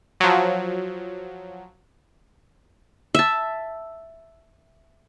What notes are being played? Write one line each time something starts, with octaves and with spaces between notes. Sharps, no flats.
F3 F#3
E5 A5